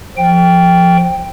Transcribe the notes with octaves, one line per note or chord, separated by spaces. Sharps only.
F3 G5